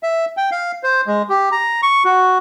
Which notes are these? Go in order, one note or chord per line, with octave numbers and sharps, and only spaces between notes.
E5
G5
F5
C5
G#3
G4
A#5
C#6
F#4